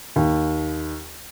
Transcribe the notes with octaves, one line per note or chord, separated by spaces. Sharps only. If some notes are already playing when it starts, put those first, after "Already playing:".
D#2